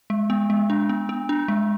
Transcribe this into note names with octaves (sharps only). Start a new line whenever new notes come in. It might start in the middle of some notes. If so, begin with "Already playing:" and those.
G#3
B3
G#3
D4
B3
B3
D4
G#3